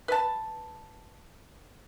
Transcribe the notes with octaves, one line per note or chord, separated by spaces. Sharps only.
B4 A5